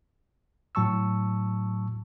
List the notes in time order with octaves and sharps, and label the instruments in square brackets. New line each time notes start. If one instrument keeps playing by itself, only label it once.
[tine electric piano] A2 F#3 A5 C#6 E6